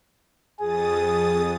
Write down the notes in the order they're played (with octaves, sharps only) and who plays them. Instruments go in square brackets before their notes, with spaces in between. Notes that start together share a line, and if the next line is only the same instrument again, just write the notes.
[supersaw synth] F2 D#6 A6 [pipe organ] G#4